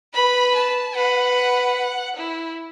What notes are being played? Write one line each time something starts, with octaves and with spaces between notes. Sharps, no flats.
B4 B5
A5
B4 F#5
F#5
E4